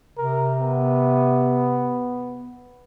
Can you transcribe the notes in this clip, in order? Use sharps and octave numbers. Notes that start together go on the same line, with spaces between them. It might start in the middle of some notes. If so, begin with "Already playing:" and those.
C3 A#4
B3